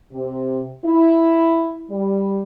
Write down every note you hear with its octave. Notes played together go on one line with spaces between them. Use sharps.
C3
E4
G3